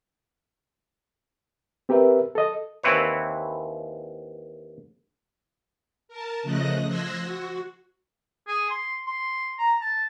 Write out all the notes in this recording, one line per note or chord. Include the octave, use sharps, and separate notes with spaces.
C4 G4 A#4 B4 E5
A4 D#5
D#2 E3 C4 E4 B4 C#5
A#4 A5
C#3 F3 A3 D#5 F#6 A#6
F3 C6 E6 F#6 G#6 A#6
F#4
G#4
C6
C6
A#5
A5